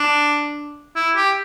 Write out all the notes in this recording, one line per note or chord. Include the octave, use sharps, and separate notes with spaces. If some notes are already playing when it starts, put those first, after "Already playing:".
Already playing: D4
E4
G4